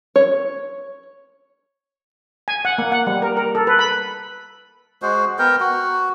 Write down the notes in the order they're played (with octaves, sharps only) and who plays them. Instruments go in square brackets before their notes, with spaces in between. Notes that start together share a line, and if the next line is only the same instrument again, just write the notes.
[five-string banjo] C#5
[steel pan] G#5
F#5
A#3
F#5
G3
A#4
A#4
A4
B4
B5
[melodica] G#3 F#4 C5
B3 A#4 G5
F#4